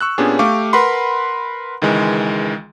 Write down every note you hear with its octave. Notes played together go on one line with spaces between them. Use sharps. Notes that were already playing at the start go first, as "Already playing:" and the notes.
C#6 E6 F#6
A#2 B3 C#4 D4 G4 G#4
A3 G4 F5 C#6 D6
A#4 B4 F#5 B5 C6
C#2 D#3 E3 G#3